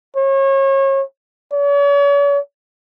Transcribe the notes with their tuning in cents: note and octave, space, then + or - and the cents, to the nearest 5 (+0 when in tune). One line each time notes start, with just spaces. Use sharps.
C#5 -30
C#5 +45